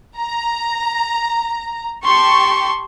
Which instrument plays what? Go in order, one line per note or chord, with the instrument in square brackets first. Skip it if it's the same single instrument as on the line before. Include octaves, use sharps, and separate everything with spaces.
[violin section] A#5
[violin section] G4 A5 C#6 [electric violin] C6